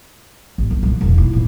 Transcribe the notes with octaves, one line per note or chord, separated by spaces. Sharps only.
A1
D#3 G3
A#1 E3
E1 A#1
D#3 E4
A#2 E3